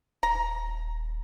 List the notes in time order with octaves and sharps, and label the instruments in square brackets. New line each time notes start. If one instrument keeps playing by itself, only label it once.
[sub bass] D#1 [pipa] A#5